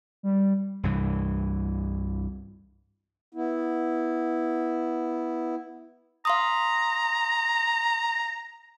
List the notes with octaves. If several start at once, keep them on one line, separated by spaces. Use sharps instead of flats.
G3
C2 G2 E3
B3 E4
F5 A#5 C6 D#6